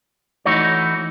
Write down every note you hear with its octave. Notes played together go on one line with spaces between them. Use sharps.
E3 A3 D#4 F#4 C#5